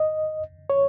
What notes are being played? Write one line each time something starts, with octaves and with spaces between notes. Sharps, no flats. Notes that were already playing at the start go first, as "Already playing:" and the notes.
Already playing: D#5
C#5